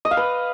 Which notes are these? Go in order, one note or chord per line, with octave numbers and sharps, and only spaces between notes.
D#5
F5
B4